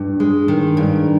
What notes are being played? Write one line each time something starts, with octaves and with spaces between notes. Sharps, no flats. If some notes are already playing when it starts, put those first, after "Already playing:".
Already playing: G2 D4
G#3
D#3
G2